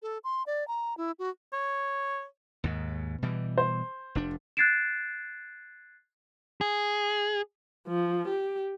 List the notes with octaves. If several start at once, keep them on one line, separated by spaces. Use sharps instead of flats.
A4
C6
D5
A#5
E4
F#4
C#5
D#2 G#2
B2 E3 G3
C5
F1 D4
F#6 G#6 A6 C7 D7 E7
G#4
F3
G4